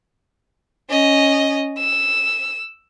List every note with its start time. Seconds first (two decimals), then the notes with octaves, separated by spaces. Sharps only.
0.90 C#4 D#5
1.78 E6